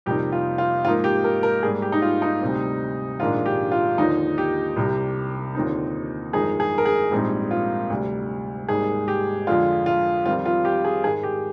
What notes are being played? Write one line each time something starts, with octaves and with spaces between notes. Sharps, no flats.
F2 C3 G3 A#3 D#4 G4
F4
F4
G#2 F3 A#3 D#4 F4
G4
A#4
A#4
G#2 G3 A#3 G#4
G4
D#4
F4
D#4
D2 C3 G3 C4
A#1 G#2 D#3 G#3 D4 F4
G4
F4
D#2 D3 F3 D#4
G4
C2 C3 G3
D#2 D3 F3 C4 D#4
G1 F2 D#3 G#3 D#4 G#4
G#4
A#4
G#4
A#1 G#2 G3 C4 D#4
F4
D2 C3 G3
G#1 G#2 G3 A#3 D#4 G#4
G4
F2 D3 G#3 F4
F4
F2 D#3 G3 C4 F4
F4
G4
G#4
G#2 D#3 G#3 G#4
G4